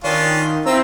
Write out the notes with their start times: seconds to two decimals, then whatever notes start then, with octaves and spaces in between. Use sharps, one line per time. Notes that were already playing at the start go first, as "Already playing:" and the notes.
0.04 D#3 C#4 D4 F4
0.66 C4 E4 F4 A#5 E6